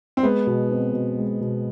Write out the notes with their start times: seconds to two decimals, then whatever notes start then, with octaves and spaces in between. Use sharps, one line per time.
0.17 C4
0.23 G#3 B3
0.47 B2
0.70 C4
0.93 B2
1.18 G#3
1.40 B2